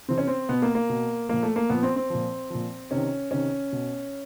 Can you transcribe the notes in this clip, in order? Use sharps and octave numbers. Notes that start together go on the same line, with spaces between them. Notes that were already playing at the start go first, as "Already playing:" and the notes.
C3 E3 C4
C#4
C4
B2 B3
A#3
A#3
B2
A#2 F3 A#3
A3
A#3
A#2 F3 B3
C4
C4
A#2 F3
A#2 F3
C3 D#3 C#4
C3 D#3 C#4
B2